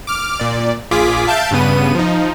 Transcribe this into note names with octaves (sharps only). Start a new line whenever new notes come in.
D6 F6
A#2 D5
A#1 F4 G#4 D6 B6
E5 F5 A5 G6 A6 D7
G2 C#3 B3 D#7
F3 D#4